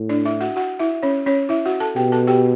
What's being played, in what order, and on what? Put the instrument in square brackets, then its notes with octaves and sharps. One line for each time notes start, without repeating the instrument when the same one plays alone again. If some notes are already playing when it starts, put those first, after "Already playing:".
Already playing: [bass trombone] A2
[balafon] D4 D5
E4 E5
F#4 F#5
F#4 F#5
E4 E5
C#4 C#5
C#4 C#5
E4 E5
F#4 F#5
A4 A5
[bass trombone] B2 [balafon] G4 G5
[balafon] A4 A5
G4 G5